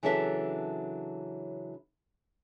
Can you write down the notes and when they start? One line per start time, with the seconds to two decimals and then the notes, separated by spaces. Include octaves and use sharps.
0.03 C#3 E3 F#3 D4 A4 E5